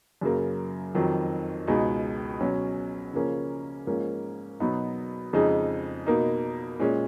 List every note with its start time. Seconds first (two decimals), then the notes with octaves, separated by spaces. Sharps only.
0.21 F#2 C#3 F#3 A#3
0.95 F2 D#3 F#3
1.67 C#2 B2 G#3 D#4
2.41 B2 F#3 C#4
3.14 C#3 F3 A#3 C#4
3.87 G#2 F3 A#3 C#4
4.60 B2 F#3 B3 D#4
5.33 F2 C#3 G#3 D#4
6.06 B2 A#3 D#4
6.79 A#2 G#3 C#4